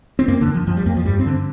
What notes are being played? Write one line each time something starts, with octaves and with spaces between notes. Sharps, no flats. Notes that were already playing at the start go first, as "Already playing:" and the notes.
C4
F2 A#3
D3
F2
F3
F2 F3
G3
F2 A#3
F3
G2 G3
C4
D3